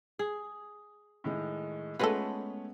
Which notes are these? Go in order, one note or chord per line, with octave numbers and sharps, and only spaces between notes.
G#4
A2 D#3 G#3
G#3 A3 B3 C#4 F4 A4 B4 C#5